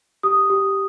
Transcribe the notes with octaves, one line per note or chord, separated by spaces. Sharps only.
G4 D#6
G4